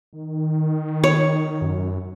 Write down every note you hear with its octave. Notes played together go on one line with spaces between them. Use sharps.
D#3
C#5
F#2